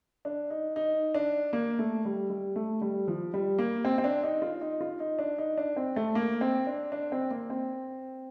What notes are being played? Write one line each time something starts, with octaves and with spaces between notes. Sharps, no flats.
D4
D#4
D#4
D4
A#3
A3
G3
G3
A3
G3
F3
G3
A#3
C4
C4
D4
D#4
F4
D#4
F4
D#4
D4
D#4
D4
C4
A3
A#3
C4
D4
D4
C4
A#3
C4